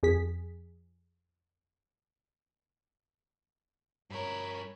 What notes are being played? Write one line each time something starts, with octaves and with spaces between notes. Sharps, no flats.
F2 G#4 B6
G2 A#4 C#5 B5